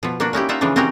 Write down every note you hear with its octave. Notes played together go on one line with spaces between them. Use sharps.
B2 F3
A#3 D4 F#4
C#4 D#4 E4 G4
D#4 F4 E5 F#5
C#3 E3 F3 D4
C4 C#4 D#4 F#4 G4 A#4